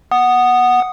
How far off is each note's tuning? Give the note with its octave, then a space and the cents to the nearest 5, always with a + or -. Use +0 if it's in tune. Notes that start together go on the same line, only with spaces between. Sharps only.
F#5 +0 D#6 -10